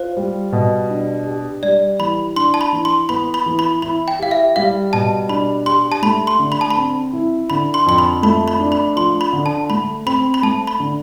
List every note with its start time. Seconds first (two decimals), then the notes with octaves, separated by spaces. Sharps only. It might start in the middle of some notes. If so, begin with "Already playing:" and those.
Already playing: F4 C5
0.17 G3
0.52 B2
0.90 D4
1.26 G4
1.62 G3 D5
1.99 E3 B5
2.36 D4 C6
2.54 A5
2.61 B5
2.73 E3
2.85 C6
3.09 B3 B5
3.34 B5
3.46 E3
3.59 B5
3.82 E4 B5
4.08 G5
4.19 G4 F5
4.31 E5
4.56 G3 F5
4.93 B2 A5
5.29 D4 B5
5.66 G4 C6
5.92 A5
6.02 A3 B5
6.27 C6
6.39 D3
6.52 B5
6.61 A5
6.70 B5
6.77 C4
7.13 E4
7.50 D3 B5
7.74 C6
7.86 F2 C6
7.98 B5
8.23 A3 B5
8.48 B5
8.59 D4
8.72 B5
8.96 F3 C6
9.21 B5
9.33 D3
9.46 A5
9.70 A3 B5
10.06 C4 B5
10.34 B5
10.42 A3 A5
10.67 B5
10.80 D3